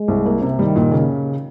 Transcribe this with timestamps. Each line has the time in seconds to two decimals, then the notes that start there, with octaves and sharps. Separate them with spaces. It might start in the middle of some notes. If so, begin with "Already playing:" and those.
Already playing: G#3
0.08 C2
0.26 A#3
0.42 C3
0.59 D#3 G3
0.76 A#2
0.91 C#3